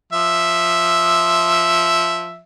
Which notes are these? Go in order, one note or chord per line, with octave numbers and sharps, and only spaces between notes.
F3 E5